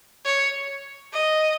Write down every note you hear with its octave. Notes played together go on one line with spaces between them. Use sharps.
C#5
D#5